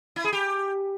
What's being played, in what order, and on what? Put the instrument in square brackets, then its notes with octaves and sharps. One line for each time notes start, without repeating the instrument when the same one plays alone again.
[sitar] E4
G#4
G4